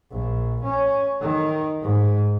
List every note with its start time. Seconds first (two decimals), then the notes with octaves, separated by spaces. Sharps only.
0.11 A#1
0.64 C#4
1.21 D#3
1.82 G#2